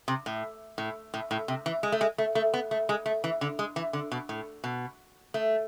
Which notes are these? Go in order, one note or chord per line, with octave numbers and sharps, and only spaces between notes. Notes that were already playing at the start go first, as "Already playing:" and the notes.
C3
A2
A2
A2
A2
C3
E3
G#3
A3
G#3
A3
A3
B3
A3
G#3
A3
E3
D3
G#3
E3
D3
B2
A2
B2
A3